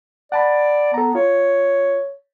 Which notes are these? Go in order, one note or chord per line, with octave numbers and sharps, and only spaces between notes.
D5 F#5 A5 B5
B3 A4 A#5
F4 C#5